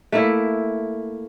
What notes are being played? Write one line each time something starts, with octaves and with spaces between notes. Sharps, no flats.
A3 A#3 E4